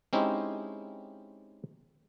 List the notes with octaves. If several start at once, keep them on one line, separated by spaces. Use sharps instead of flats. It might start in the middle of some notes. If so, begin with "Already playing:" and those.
G#3 C4 C#4 D#4 E4 G4